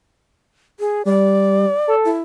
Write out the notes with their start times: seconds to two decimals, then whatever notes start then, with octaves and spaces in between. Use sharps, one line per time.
0.80 G#4
1.05 G3 D5
1.88 A4
2.05 E4